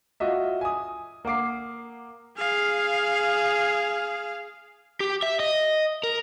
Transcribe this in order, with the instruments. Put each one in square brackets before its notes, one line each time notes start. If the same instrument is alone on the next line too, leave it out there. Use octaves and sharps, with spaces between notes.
[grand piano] F4 F#4 D#5 E5
G#5 D#6
A#3 F#5 D6 C7
[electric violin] G#4 F5
[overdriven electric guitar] G4
E5
D#5
A#4